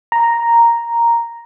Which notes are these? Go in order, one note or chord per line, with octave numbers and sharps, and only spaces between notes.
A#5